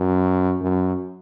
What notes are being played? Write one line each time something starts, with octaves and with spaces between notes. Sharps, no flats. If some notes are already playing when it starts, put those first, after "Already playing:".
Already playing: F#2
F#2